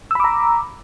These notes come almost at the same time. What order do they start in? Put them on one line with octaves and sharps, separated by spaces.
E6 B5 D6 A#5